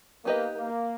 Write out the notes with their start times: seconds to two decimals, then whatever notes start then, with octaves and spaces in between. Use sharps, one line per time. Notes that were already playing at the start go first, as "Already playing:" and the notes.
0.25 A#3 B3 D#4 G4 B4 D#5
0.56 A#3